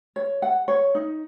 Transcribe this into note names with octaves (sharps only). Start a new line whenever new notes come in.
C#5
F#5
C#5
D#4